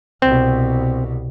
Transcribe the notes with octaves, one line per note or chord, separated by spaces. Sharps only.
C2 B2 C4